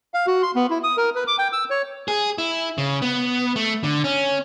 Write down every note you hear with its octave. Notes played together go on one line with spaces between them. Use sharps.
F5
F#4
C6
B3
E4
D#6
A#4
B4
D6
G5
E6
C#5
G#4
E4
C#3
B3
A3
D3
C#4